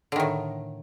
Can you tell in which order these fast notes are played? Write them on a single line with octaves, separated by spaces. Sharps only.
D3 D#3 A2